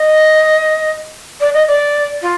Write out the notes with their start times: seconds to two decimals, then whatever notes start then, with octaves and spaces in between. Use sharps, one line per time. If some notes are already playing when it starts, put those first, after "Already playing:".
Already playing: D#5
1.40 D5
1.54 D#5
1.67 D5
2.22 F4